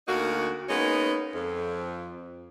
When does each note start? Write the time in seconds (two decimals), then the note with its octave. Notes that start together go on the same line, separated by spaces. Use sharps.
0.07 D2 A#3 D#4 F#4
0.69 G#3 A#3 B3 C#4 D#4
1.34 F2